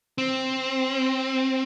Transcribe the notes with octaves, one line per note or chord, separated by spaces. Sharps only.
C4